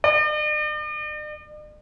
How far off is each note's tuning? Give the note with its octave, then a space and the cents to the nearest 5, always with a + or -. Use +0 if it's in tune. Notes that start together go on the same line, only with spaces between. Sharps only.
D5 +45